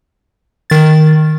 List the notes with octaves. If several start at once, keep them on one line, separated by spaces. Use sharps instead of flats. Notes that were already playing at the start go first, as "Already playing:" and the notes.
D#3 A6